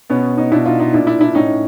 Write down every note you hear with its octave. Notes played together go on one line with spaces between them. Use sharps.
B2 B3 C#4
C#4 D#4
B2 D4 E4
D#4 F4
D#4 F4
A#2 D4 E4
D4 E4
D4 E4
A2 C#4 D#4